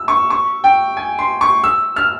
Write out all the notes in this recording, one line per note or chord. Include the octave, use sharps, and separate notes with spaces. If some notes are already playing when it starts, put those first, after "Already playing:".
Already playing: E6
C#6
C#6
G5
G#5
C6
C#6
E6
F6